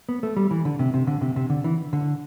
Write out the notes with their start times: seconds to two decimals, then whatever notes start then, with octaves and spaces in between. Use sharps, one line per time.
0.09 B3
0.23 A3
0.36 G3
0.51 E3
0.65 D3
0.79 C3
0.94 C3
1.07 D3
1.21 C3
1.36 C3
1.50 D3
1.64 E3
1.93 D3